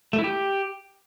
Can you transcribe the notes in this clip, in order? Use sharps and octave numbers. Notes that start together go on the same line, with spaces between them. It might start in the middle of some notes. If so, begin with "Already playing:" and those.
A3
E4
G4